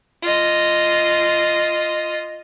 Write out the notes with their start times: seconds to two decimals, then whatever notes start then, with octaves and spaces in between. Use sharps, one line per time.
0.23 F4 D#5